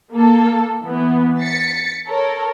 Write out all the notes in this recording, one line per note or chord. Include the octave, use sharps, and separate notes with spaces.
A#3 A4
E3 B3
A6 B6 C#7
A4 A#4 C#5